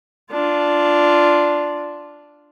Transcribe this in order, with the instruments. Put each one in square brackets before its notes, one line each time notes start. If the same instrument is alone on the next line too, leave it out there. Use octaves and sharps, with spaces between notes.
[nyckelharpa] D4 F4